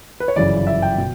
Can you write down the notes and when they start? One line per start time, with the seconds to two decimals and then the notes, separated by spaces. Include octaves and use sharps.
0.20 B4
0.28 C#5
0.36 G1 F#2 C#3 E3 D5
0.67 E5
0.82 G5
0.98 B2